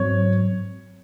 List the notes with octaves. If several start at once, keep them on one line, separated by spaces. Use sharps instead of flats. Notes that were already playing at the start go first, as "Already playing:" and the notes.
Already playing: G#2 F#3 C4 C#5